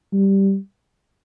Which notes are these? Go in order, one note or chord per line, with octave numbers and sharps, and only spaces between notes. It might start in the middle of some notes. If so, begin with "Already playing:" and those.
G3